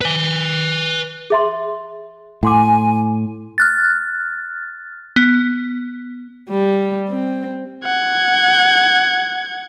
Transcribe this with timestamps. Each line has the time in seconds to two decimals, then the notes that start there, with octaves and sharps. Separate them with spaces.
0.01 B4 G#5
1.30 G#4 E5 C6
2.43 A2 F#5 G#5 C6 D6
3.58 F6 F#6 A6
5.16 B3
6.50 G3
7.09 C4
7.85 F#5 G#6